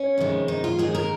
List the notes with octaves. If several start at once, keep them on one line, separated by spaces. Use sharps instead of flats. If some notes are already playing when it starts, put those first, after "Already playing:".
Already playing: C#4
F2 C3 D#3 G#3
D#4
F4
D#2 D#3 G#3 G#4
A#4